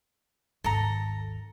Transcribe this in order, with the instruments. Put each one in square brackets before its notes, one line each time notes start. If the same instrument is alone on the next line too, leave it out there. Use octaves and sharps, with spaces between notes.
[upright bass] G#1 D#2 [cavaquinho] A4 A#5